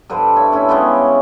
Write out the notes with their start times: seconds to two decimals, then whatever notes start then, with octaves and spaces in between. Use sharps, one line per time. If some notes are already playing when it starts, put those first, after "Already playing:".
0.10 G2 D3 B4 C5
0.36 C#5 E5
0.52 A3 C#4 E4
0.69 C#3 G3 G#3 B3